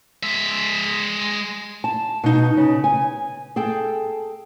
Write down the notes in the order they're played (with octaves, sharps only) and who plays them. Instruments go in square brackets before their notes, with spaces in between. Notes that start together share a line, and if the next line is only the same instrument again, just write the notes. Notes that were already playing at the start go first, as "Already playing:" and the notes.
[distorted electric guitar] G#3 E5
[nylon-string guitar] A5
B2 D#4
C#3
G#5
G#4 A4 G5